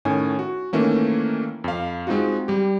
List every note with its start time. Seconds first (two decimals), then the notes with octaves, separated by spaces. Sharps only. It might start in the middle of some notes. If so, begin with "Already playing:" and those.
0.05 A2 D#3 C#4 G#5
0.39 F#4
0.73 D#3 E3 A3 A#3 C#4
1.64 F2 F5
2.07 G#3 C4 D#4 F4 F#4
2.48 G3 G4